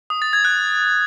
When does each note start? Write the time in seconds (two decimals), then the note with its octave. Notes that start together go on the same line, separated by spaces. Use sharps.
0.10 D#6
0.22 A6
0.33 G#6
0.45 F#6